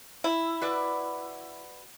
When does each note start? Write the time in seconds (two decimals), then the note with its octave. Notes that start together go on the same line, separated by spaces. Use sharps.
0.24 E4
0.61 F#4 B4 D5